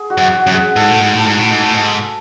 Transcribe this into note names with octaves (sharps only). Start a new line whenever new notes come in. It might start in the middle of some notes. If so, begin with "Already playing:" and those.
Already playing: G#4
F#4
F#2
F#4
F#2
G#4
G#2 A4
A2 A4
G#2
A2
A4
G#2
A2
G#2
A2
G#2